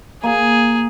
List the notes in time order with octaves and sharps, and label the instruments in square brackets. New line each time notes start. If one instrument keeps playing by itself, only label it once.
[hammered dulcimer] A#3 [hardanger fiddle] G#4